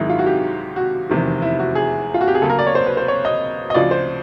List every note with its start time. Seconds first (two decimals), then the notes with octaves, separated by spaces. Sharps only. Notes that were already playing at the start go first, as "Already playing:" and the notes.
Already playing: G#1 F#2 D#3 G#3 D#4 E4
0.10 F4
0.19 F#4
0.26 G4
0.76 F#4
1.09 F1 E2 C3 D#3
1.42 E4
1.59 F#4
1.75 G#4
2.14 F4
2.21 F#4
2.28 G4
2.35 G#4
2.42 D2 C#3 F#3 A#3 A4
2.50 A#4
2.59 D5
2.67 C#5
2.75 C5
2.86 B4
2.97 C5
3.08 C#5
3.25 D#5
3.70 D#5
3.74 D2 C#3 F3 D5
3.91 C5